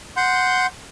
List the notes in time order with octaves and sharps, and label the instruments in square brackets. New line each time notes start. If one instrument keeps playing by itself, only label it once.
[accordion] F#5 C6 G6